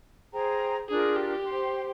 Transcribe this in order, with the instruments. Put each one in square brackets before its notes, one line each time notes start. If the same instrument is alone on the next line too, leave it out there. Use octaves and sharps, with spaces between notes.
[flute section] G#4 C5 G5 A#5
[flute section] D4 F4 A#4 [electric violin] G#4
[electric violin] G4
[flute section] C5 G5 C6